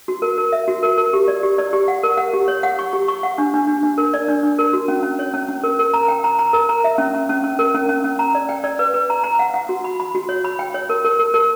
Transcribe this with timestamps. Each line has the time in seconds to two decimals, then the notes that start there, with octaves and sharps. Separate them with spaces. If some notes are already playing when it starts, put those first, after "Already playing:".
0.08 F#4
0.22 A#4
0.38 A#4
0.52 E5
0.68 F#4
0.83 A#4
0.98 A#4
1.13 G4
1.28 D5
1.43 G4
1.58 D5
1.73 G4
1.88 F#5
2.03 A#4
2.17 F#5
2.34 G4
2.48 C#5
2.63 F#5
2.79 C#6
2.93 G4
3.08 C#6
3.23 F#5
3.38 D4
3.54 D4
3.68 D4
3.83 D4
3.98 A#4
4.14 D5
4.28 D4
4.43 D4
4.59 A#4
4.73 F#4
4.88 C#4
5.03 C#4
5.19 C#5
5.34 C#4
5.48 C#4
5.63 A#4
5.79 A#4
5.94 A#5
6.08 G5
6.24 A#5
6.39 A#5
6.53 A#4
6.69 A#5
6.84 E5
6.98 C#4
7.14 C#4
7.29 C#4
7.44 C#4
7.59 A#4
7.75 C#4
7.89 C#4
8.04 C#4
8.19 A#5
8.35 D5
8.49 G5
8.64 D5
8.79 B4
8.94 B4
9.10 A#5
9.24 A#5
9.39 F#5
9.54 F#5
9.69 F#4
9.84 B5
10.00 B5
10.15 F#4
10.29 C#5
10.44 B5
10.59 G5
10.74 C#5
10.89 A#4
11.05 A#4
11.19 A#4
11.34 A#4